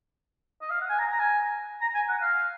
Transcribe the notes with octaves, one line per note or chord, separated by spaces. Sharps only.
D#5
F5
F#5
G#5
A#5
A#5
G#5
A#5
G#5
F#5
F5